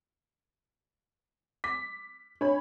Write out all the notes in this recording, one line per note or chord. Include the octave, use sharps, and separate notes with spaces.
D6 B6
D4 C#5 B5